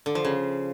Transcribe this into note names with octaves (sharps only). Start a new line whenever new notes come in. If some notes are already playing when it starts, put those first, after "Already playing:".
D3
F3
C#3